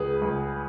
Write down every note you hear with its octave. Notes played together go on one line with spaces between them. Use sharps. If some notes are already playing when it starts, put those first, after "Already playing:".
Already playing: C#2 G#4 B4
C#2